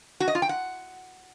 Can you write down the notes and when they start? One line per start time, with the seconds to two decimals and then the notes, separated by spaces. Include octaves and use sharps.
0.20 F#4
0.28 D#5
0.35 F4
0.42 G5
0.49 F#5